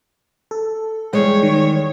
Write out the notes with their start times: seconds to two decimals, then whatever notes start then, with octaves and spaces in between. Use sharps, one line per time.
0.51 A4
1.13 E2 G3 G#3 C#5
1.43 D#3